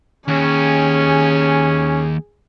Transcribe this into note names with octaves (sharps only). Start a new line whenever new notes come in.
D#2 C#4 G#4